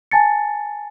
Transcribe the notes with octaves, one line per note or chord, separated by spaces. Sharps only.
G#5 A5 A6 C#7